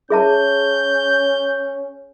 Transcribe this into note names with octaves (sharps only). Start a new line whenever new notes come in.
C#4 G#4 E5 A5 G6